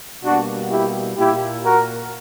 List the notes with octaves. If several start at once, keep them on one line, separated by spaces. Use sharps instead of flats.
B2 G3 A#3 D4 F#4
E4 G4
A#2 A#3 E4 G4
F#4 A#4